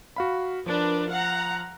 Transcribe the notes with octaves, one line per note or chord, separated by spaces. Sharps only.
F#4 F5 B5
F3 D4 A#4 B4
F5 F#5 A#5